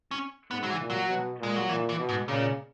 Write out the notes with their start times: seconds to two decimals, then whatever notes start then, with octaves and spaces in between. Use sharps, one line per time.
0.11 C#4
0.51 G#2 B3
0.63 F#3
0.70 E3
0.80 A#2
0.90 F#3
1.10 B2
1.39 A#2 G#3
1.56 F#3
1.69 A#2 E3
1.89 E3
1.98 B2
2.09 G#2
2.28 A#2 C#3